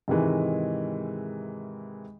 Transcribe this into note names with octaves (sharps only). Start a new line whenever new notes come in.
G#2 C3 D#3 E3 G#3